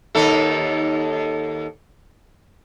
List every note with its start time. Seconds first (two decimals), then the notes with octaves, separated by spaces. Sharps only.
0.15 D#2 D#4 A4